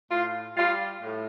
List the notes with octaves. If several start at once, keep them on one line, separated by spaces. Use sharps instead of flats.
A2 F4
G3 F4
A2